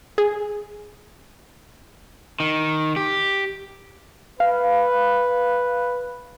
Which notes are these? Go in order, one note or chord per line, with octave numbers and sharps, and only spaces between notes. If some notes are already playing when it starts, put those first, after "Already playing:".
G#4
D#3
G4
B4 F5